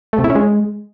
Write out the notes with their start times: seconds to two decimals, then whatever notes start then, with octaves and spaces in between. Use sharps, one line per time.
0.13 A3
0.19 C3
0.24 E4
0.30 C#4
0.35 G#3